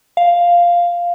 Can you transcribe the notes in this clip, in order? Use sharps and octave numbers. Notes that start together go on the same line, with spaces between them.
F5